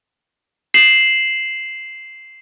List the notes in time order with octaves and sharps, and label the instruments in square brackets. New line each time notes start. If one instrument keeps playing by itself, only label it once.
[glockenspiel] C7 E7 F#7